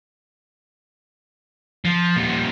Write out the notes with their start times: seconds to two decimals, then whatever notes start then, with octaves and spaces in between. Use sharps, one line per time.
1.85 F3
2.16 A#2 G3